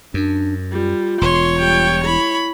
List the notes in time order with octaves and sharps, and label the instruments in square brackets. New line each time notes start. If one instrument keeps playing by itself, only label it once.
[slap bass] F#2 [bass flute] D4
[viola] G3 [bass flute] F4
[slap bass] E1 [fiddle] C#5 [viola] C6
[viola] G3 G5
[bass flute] E4 [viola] B5